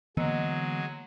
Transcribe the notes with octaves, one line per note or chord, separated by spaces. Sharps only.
D3 E3 F#3 G#3 A#3 B3 D#5 E6